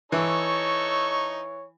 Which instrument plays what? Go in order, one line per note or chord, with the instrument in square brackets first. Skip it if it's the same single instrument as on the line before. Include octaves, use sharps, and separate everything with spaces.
[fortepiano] E3 [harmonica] D#4 A4 C#6 [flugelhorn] C#5